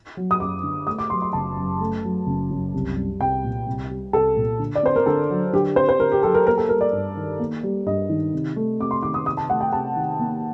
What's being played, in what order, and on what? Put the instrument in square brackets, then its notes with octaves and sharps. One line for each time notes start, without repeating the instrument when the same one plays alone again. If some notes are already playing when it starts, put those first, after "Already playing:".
[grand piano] F#3
[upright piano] D#6
[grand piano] F#2 [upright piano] D6
[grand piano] D3
[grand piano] A3 [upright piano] D#6
[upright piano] D6
[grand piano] F#3 [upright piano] C6
[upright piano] C6
[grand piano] F#1 [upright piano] A5
[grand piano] F#2
A3
F#3
F#1
F#2
C2
G3
[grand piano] C2 [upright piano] G5
[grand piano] A#2
C2
G3
[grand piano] C2 [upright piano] A4
[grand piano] A#2
D3
[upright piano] D5
[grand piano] C4 [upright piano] C5
[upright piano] A#4
[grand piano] D3 [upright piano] A4
[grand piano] F#3
[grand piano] D3 [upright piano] G4
[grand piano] C4 [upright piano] C5
[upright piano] C5
[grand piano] D3 [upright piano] A#4
[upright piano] G4
[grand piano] F#3 [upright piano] A4
[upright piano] A#4
[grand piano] A#3 [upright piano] A#4
[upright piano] A4
[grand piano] G3 [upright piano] A#4
[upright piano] D5
[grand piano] G2
D#3
A#3
G3
[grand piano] G2 [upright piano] D#5
[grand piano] D#3
C3
A3
[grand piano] C3 [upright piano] D6
[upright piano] C6
[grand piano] D#3 [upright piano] D6
[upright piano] D#6
[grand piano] C3 [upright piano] D#6
[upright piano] A5
[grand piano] A3 [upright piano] F#5
[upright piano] G5
[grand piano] C3 [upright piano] A5
[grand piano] D#3
A#3